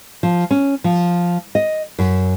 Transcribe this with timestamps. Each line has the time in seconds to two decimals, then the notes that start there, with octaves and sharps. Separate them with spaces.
0.23 F3
0.51 C#4
0.84 F3
1.55 D#5
1.99 F#2